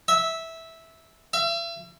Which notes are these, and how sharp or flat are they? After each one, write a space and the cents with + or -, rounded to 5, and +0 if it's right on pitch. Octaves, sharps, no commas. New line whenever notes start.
E5 -10
E5 +40